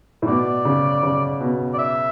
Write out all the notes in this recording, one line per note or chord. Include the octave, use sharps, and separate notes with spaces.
A2
B2 D5
C#3
C#3
B2
D5
E5